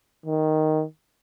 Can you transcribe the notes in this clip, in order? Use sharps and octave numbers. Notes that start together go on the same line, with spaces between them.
D#3